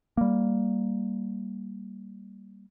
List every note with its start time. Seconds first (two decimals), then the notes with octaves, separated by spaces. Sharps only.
0.17 G3 A#3